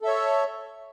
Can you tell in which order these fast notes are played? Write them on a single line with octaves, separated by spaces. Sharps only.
A4 E5 C#5